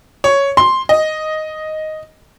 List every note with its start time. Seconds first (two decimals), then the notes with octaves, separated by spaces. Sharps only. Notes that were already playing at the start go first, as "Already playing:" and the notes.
0.24 C#5
0.57 C6
0.89 D#5